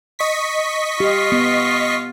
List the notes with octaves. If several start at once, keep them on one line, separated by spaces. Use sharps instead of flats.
D#5 C#6 B6
F4 G4
B3